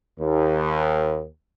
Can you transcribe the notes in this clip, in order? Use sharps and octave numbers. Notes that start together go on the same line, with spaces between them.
D#2